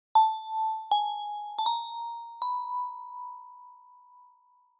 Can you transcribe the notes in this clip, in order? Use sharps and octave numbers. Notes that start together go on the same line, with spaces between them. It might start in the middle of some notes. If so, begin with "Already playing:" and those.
A5
G#5
A5
A#5
B5